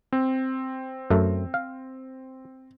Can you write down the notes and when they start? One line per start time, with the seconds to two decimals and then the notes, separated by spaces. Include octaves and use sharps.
0.13 C4
1.10 F#2 A3
1.54 F5